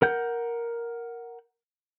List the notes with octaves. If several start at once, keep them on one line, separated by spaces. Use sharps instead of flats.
A#4 F#5 G6